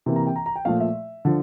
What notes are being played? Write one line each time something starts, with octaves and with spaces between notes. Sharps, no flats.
C3 E3 A#3
A#5
G5
A#5
A#5
G5
A#2 F3 A3 F5
E5
D3 F3